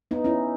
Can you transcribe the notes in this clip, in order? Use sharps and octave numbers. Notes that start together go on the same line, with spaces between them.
B3 D#4
C#4 E4